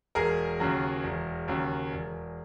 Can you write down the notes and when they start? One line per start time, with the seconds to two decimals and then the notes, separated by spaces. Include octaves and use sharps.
0.15 E1 G#4 A#4
0.60 D#2 C#3 F#3
1.04 E1
1.48 D#2 C#3 F#3
1.92 E1